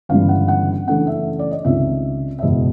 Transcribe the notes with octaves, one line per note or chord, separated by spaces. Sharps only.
G1 F#2 C#3 E3 G3 F5
F#5
F#5
F#2 C#3 E3 A3 D4 F#5
E5
D5
D#5
C#2 C3 D#3 E5
E5
F#1 E2 B2 G#3 B3 D#5